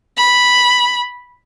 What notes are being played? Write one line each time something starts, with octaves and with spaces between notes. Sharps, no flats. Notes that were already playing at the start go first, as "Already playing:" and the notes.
B5